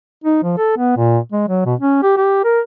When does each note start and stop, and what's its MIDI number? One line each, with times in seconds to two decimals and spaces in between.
0.24 0.39 63
0.43 0.53 53
0.57 0.75 69
0.77 0.94 59
0.97 1.18 46
1.32 1.44 56
1.48 1.61 54
1.66 1.74 47
1.80 1.99 61
2.03 2.13 67
2.17 2.40 67
2.44 2.60 70